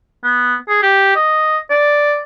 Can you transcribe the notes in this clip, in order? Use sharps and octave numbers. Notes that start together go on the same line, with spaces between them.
B3
G#4
G4
D#5
D5